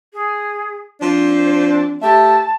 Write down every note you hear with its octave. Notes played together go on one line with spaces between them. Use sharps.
G#4
F3 C4 D4 C5
A3 G4 E5 A5